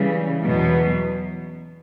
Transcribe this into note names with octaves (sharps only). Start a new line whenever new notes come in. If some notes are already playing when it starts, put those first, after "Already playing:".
Already playing: C#3 E3 G3
E2 B2 F#3 B3